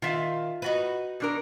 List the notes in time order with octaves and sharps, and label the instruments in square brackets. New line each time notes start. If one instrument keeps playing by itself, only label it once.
[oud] D#3 [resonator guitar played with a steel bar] F4 E5 F5
[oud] D#4 F#4 B4
[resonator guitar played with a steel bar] B2 D4 A#4